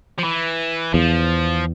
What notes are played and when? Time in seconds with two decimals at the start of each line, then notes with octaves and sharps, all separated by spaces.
0.18 F3
0.24 E3
0.94 E2 F3